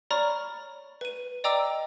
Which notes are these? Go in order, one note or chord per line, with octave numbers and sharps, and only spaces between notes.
C#5 D5 A#5 B5 C#6 F6
B4 D#7
D5 D#5 G5 A#5 D6 E6